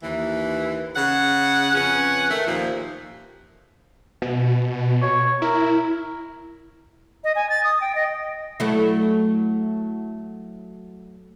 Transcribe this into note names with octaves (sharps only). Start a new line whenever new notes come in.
D#2 E3
C#3 F#5
F2 C#4 B4 F#5
D#3 A3
D#2 A#2 F3
B2
C#5
E4 A#4
D#5
G#5
A6
D#6
G5
D#5
F#3 A3 E4